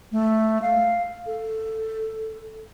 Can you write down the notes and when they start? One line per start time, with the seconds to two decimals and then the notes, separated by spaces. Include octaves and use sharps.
0.12 A3
0.62 F5
1.26 A4